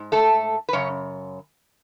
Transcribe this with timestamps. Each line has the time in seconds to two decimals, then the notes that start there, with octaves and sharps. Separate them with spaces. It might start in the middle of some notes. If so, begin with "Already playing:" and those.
Already playing: G#2
0.12 A3 A4
0.69 B4
0.73 F#2 C#3 C#4 C#5